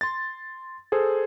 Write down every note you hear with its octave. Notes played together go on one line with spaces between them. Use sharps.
C6 A6
G#4 A4 C5